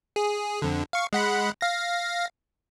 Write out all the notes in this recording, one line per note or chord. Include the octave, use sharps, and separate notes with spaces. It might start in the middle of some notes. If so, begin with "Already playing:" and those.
G#4
F2 D3
F5 C#6
G#3 F#5 B5
F5 A#6